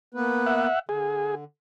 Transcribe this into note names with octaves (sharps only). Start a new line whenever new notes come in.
A#3 B3 B4
E5 F#5
D3 G#4